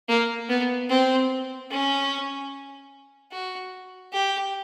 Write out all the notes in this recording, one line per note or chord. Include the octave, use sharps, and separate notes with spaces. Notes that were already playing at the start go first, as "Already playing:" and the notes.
A#3
B3
C4
C#4
F#4
G4